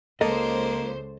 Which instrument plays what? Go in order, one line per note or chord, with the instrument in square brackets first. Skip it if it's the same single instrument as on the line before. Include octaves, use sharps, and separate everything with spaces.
[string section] C#2 C5 [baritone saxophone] A#3 [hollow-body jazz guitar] A4 D#5